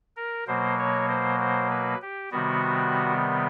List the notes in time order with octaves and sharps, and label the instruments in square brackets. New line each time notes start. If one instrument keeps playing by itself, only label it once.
[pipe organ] A#4
B2 F#3 A#3 C5
C#5
C5
C5
B4
G4
C3 D#3 G3 B3 F#4